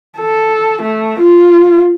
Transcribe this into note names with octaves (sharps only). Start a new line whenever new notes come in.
A4
A3
F4